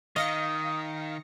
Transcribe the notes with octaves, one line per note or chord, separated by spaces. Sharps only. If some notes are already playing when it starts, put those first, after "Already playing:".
D#3 D#5 F5 D#6 A#6 C#7